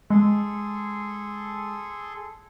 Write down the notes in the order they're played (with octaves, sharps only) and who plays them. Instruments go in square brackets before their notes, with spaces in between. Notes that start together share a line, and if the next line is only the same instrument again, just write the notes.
[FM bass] G#3 [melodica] G#4 A4 C6